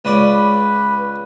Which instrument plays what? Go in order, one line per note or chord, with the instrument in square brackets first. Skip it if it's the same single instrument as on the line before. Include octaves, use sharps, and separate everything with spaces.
[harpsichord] C#2 C#4 D5 [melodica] B4